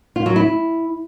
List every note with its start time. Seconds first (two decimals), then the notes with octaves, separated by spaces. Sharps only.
0.16 F4
0.26 F#3
0.36 E4